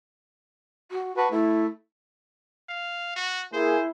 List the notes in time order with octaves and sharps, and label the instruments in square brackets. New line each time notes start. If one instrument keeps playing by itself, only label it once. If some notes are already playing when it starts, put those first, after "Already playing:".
[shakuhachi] F#4
[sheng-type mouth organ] F#4 B4 [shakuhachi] A5
[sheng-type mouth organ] A3 [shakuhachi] E4
[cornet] F5
F#4
[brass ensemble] A#3 G#4 [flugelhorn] E4 [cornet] C5